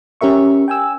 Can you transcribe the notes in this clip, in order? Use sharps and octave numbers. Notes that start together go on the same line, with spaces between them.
C#4 G4 A#4 E5 C#6
G5 G#5 E6